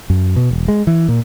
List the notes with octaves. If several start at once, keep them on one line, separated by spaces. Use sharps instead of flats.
F#2
B2
E1
G#3
E3
A#2